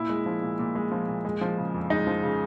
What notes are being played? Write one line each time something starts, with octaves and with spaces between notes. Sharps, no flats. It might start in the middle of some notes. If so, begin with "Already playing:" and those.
Already playing: A#2 E4
G#3
F3
A#2
A#2
G#3
F3
A#2
G#3
F3
C#3
F2
G#3 D#4
F3
C#3